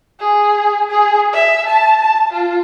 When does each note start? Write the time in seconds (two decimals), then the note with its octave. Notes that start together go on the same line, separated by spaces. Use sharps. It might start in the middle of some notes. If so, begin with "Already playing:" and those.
0.20 G#4
0.90 G#4
1.33 E5
1.66 A5
2.02 A5
2.33 F4